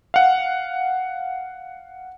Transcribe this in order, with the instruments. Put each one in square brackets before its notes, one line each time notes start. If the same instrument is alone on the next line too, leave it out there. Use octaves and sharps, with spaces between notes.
[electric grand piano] F5 F#5